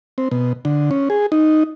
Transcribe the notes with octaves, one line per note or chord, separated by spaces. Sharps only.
C4
B2
D3
C#4
G#4
D#4